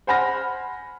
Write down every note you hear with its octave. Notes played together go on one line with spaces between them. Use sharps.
C5 F#5 G#5 B5 F6 A#6